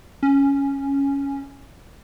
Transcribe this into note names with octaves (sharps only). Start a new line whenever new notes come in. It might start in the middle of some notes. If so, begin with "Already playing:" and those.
C#4